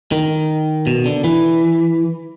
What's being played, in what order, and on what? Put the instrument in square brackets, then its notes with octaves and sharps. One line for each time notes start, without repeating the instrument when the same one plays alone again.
[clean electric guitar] D#3
B2
D3
E3